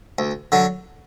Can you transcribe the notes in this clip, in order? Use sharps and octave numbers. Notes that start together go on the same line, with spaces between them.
D2
D3 F#3